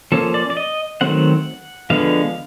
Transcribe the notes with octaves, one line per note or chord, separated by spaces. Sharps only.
F3 A#3 C#4 A4
D5
D5
D#5
D#3 F#3 A3 C4 F#5
D3 F3 G#3 B3 F5